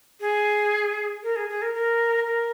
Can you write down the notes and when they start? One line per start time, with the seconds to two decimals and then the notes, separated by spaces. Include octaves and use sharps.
0.21 G#4
1.23 A#4
1.36 G#4
1.49 G#4
1.62 A#4
1.74 A#4
2.26 A#4